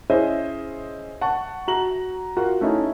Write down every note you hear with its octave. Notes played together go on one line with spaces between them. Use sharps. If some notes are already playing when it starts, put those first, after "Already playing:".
C#4 E4 G#4 C5 D#5 E5
F#5 A5 C#6
F#4 A#5 F#7
F4 F#4 A#4 F#5
A3 C#4 D#4 E4